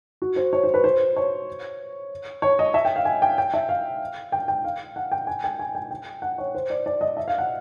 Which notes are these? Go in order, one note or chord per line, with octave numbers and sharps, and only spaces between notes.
F#4
C5
C#5
C5
B4
C5
C#5
C#5
D#5
E5
G5
F5
G#5
G5
G5
E5
F5
G5
G5
F5
F#5
G5
G#5
G5
G#5
G5
G5
F#5
C#5
C5
D5
D5
D#5
E5
F5
F#5